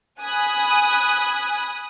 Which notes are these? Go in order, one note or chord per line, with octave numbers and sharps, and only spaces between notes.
G#5 B5 D#6 F#6